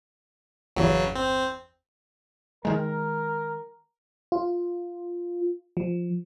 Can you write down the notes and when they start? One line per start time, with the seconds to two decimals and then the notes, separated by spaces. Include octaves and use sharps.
0.76 G1 E2 C#3 F#3
1.15 C4
2.65 D#3 G#3 A#4
4.32 F4
5.77 F3